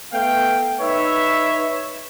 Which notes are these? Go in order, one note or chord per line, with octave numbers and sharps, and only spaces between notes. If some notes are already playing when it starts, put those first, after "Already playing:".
A3 B3 F5 G5
D#4 B4 C#5 E5